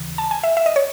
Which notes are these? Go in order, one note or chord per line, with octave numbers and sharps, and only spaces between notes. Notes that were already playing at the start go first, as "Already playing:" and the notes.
Already playing: D#2 C#3 E3
A5
G#5
E5
E5
D#5
C#5